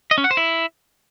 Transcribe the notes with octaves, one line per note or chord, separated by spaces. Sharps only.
D#5
C#4
F#5
C5
E4